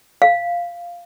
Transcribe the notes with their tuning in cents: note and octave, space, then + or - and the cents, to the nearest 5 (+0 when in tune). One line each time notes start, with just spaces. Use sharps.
F5 -5